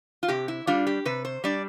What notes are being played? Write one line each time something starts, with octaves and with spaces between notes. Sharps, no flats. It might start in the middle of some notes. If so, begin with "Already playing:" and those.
F4
C3 G4
E4
G3 D4 F4
G4
C3 B4
C5
G3 D4 D5